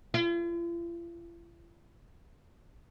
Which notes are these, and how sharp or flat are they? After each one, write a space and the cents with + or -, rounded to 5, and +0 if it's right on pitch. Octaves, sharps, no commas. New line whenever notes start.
F4 -45